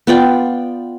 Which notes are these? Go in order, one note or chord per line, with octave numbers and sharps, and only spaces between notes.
B3 F4 D5 G5